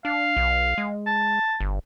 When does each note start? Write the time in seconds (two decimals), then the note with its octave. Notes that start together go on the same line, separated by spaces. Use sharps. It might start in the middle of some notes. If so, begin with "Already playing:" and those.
0.05 D4 F5
0.37 B1
0.78 G#3
1.07 A5
1.60 G1